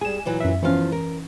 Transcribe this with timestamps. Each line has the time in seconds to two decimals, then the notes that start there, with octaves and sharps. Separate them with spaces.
0.01 G3 G#4 G#5 E7
0.25 A#2 E3 F#3
0.40 F#2 E5
0.62 E2 E3 F3 C#4 F5
0.92 A#4